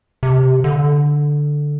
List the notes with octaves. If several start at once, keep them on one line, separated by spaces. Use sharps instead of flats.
C3
D3